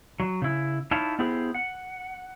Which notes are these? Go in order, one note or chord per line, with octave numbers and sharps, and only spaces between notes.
F#3
C#3 E4
D#4 E4 C#5 F5 A5
B3 E4 G4 G#4 C5
F#5